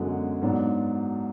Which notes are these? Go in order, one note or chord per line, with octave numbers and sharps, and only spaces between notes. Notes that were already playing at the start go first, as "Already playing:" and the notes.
Already playing: F#2 D3 G#3 B3 F#4 F#5
G#2 F#3 B3 D4